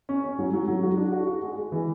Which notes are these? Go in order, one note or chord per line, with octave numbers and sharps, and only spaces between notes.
C#4
C#4
F#3
F#3
F#3
F#4
D4
F#4
F#4
G#3
G#3
E3